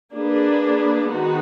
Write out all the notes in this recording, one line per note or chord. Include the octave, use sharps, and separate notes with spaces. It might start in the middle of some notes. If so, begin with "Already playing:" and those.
A#3 D4 G#4 B4
D#3 G#3 B3 D#4 F#4